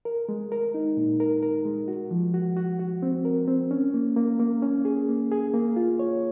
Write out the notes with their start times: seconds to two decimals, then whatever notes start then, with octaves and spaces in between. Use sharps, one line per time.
0.05 A#4
0.29 G#3
0.52 A#4
0.74 D#4
0.97 A#2
1.20 A#4
1.43 A#4
1.65 G#3
1.88 F#4
2.11 F3
2.34 F#4
2.56 F#4
2.80 F#4
3.03 C4
3.25 A#4
3.48 C4
3.71 C#4
3.94 A#3
4.16 A#3
4.40 A#3
4.62 C#4
4.85 G#4
5.09 A#3
5.31 G#4
5.54 A#3
5.76 F4
5.99 C#5